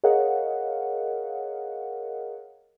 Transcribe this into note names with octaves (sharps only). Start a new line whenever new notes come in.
G#4 A#4 C#5 D#5 F5 F#5